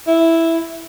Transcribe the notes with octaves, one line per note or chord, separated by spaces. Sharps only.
E4